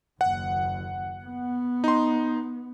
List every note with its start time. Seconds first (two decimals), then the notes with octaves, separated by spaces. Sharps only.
0.21 F#1 D#2 F#5
1.24 B3
1.84 D#4 C6